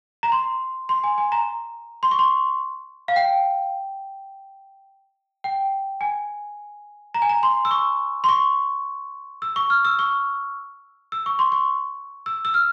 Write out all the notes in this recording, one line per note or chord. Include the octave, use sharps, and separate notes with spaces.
A#5
C6
C6
G#5
G#5
A#5
C6
C#6
C6
F5
G5
G5
G#5
A#5
G#5
A#5
C6
E6
C#6
C6
C#6
E6
C#6
F6
E6
C#6
E6
C#6
C6
C#6
E6
E6
F6